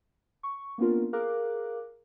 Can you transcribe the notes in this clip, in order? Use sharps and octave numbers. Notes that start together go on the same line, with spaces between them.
C#6
A#3 B3 C#4 D4 F4 A#4
G#4 A#4 F5 D6 F#6